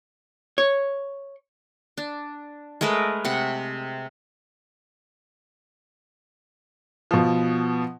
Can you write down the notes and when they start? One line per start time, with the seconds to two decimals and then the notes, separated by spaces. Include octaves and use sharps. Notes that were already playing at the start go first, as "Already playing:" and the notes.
0.58 C#5
1.97 D4
2.81 G#3 A3 A#4 B4
3.25 C3 F#5
7.11 B2 F3